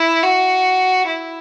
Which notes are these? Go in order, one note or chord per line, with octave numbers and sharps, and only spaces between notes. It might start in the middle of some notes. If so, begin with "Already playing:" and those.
Already playing: E4
F#4
E4